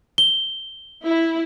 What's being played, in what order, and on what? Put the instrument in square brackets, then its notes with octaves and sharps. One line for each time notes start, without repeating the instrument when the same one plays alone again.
[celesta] G7
[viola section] E4